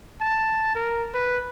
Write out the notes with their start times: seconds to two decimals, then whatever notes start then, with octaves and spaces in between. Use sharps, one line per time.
0.21 A5
0.75 A#4
1.14 B4